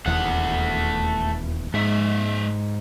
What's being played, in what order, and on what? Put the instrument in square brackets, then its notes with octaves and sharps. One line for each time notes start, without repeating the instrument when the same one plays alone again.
[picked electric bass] D#1 E2 [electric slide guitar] A3 F#5
[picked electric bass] G#2 [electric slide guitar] G#3 E5